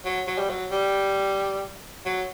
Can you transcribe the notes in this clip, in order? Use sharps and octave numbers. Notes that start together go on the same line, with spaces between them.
F#3
F#3
G3
F#3
G3
F#3